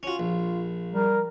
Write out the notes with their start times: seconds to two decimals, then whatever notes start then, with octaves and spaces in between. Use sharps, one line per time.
0.03 C#4 F4 F#4
0.19 A#1
0.93 G3 A#4